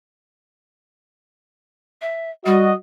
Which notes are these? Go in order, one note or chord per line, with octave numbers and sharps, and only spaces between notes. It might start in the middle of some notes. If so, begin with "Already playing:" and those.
E5
G3 F#4 D#5